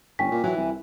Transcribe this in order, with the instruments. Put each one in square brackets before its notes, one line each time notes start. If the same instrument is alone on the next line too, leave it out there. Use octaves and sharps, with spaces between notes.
[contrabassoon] G1 [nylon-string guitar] C#4 [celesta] G5 G#5 B6
[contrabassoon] A#2
[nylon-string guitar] E3 E4 [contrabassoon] F#3
[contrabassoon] C2